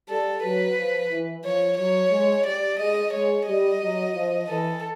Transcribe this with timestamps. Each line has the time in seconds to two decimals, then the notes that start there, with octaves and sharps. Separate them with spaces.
0.09 G3 A4
0.43 F#3 B4
0.77 F3
1.10 E3
1.44 F3 C#5
1.78 F#3 C#5
2.11 G#3
2.45 G3 D5
2.79 G#3 D#5
3.13 G#3 C#5
3.47 G3 D#5
3.81 F#3
4.14 F3
4.48 E3 A4